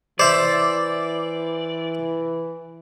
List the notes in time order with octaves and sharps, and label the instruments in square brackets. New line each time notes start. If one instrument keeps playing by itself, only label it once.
[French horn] E3 [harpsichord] C5 E5 [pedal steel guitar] D5